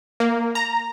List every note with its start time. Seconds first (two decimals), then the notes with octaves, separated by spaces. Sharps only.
0.20 A#3
0.55 A#5